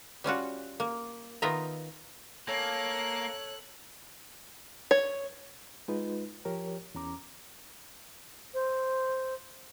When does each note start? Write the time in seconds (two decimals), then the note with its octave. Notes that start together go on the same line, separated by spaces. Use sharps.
0.24 G3 C#4 F4 F#4
0.80 A#3
1.42 D#3 B3 F4 D#5 E5 A#5
2.48 A#3 A4 C#5 F#6
4.91 C#5
5.88 G#3 D#4 F4 B4
6.45 F3 G4 A#4 C#5
6.95 E2 C#4 A#5 D6
8.54 C5